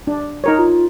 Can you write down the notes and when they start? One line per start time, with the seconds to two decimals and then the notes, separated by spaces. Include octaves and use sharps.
0.07 D4
0.44 D#4 A#4 C#5
0.58 F4